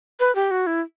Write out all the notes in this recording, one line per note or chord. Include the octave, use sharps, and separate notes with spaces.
B4
G4
F#4
E4